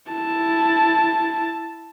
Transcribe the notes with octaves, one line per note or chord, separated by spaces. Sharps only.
E4 A5